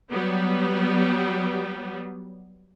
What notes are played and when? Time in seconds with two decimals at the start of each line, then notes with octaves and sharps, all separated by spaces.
0.10 F#3 G3 B3